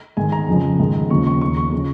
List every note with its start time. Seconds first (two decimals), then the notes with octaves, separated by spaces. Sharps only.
0.17 G#2 D#3 G#5
0.32 A#5
0.48 F2 C#3 F3
0.79 G#2 D#3
1.10 D#2 C#3 F3 C#6
1.27 C#6
1.41 D#2 D#3 C#6
1.57 C#6
1.72 C#3 F3